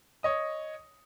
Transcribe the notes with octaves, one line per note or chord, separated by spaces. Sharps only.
C#5 D#5 D#6